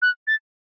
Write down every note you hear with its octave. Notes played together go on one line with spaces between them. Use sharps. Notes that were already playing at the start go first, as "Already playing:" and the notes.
F#6
A6